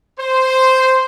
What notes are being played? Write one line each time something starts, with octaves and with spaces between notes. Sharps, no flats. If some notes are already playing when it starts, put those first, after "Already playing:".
C5